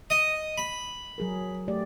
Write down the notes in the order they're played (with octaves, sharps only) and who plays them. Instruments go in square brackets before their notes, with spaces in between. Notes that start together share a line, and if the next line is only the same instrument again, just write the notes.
[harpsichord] D#5
B5
[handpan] F#3 G#4 A#4
A3 G4 D5